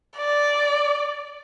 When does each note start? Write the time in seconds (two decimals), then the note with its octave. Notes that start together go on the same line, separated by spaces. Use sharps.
0.17 D5